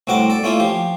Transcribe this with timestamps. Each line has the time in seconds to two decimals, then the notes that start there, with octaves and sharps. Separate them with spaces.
0.07 C2 A2 C4 F#4 A#4 D6
0.30 A4 D5
0.44 A3 A#3 C#4 E4 F4
0.60 F3 G4